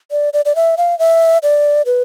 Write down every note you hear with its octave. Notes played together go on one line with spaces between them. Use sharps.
D5
D5
D5
E5
F5
E5
D5
B4